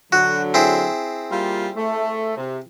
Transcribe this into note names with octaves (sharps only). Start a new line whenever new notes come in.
D3 F#3 F#4
C4 E4 G#4
G3 A#3 F4
A3
C3